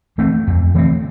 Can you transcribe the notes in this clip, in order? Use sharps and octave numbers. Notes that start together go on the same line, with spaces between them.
E3 A3 C4
F2
E3 A3 C4